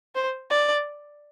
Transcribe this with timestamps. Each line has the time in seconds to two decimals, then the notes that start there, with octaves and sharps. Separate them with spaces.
0.15 C5
0.51 D5